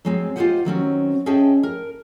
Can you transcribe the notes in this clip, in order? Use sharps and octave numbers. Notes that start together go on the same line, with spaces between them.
F#3 G#3 C4
F4 G4 B4 C5 D#5 F#5
D#3 F#3 C4 C#4
C#4 G#4 D#5 E5 G5 A5
A#4